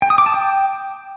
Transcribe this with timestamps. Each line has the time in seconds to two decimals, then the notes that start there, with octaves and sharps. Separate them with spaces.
0.02 G5
0.10 D#6
0.18 D6
0.26 A5
0.34 G5